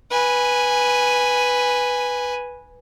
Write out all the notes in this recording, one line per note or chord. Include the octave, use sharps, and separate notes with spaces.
B4 G#5